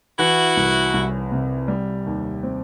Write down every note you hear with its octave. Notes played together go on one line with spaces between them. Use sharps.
E3 E4 F#4
C2
C2
C3
G3
D#2
C4